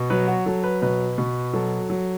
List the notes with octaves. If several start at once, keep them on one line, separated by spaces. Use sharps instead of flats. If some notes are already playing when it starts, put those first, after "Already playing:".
Already playing: B2
F#3 B4
F#4
F#3 A4
B4
B2 B4
B2
F#3 A4
F#3